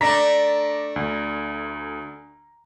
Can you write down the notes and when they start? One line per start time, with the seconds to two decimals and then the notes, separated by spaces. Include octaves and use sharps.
0.01 A3 D4 D5 A#5 A#6 B6
0.96 D2